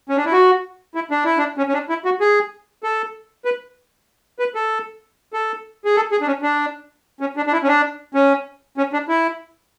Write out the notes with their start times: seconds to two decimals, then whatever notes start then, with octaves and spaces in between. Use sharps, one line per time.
0.09 C#4
0.17 D4
0.25 E4
0.32 F#4
0.95 E4
1.11 D4
1.25 E4
1.38 D4
1.58 C#4
1.68 C#4
1.73 D4
1.89 E4
2.05 F#4
2.20 G#4
2.83 A4
3.45 B4
4.39 B4
4.55 A4
5.33 A4
5.85 G#4
5.96 A4
6.12 G#4
6.21 D4
6.27 C#4
6.42 D4
7.21 C#4
7.37 D4
7.47 D4
7.53 E4
7.63 C#4
7.68 D4
8.14 C#4
8.77 C#4
8.93 D4
9.08 E4